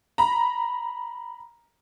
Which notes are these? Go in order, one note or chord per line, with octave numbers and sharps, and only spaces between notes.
A#5 B5